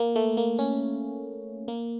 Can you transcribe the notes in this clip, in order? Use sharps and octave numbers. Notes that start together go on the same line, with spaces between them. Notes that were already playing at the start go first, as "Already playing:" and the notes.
Already playing: A#3
A3
A#3
C#4
A#3